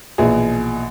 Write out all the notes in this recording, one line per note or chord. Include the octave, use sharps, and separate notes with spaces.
A#1 B2 E3 G#4